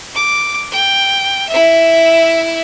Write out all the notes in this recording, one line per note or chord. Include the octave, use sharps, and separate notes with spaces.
D6
G5
E4 E5